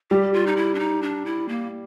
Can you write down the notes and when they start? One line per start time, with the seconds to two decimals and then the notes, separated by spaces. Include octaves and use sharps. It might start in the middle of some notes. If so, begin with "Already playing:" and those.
0.11 G3 G4
0.33 F4
0.46 D#4
0.56 E4
0.75 D4
0.79 D#4
1.02 D4
1.26 E4
1.48 A#3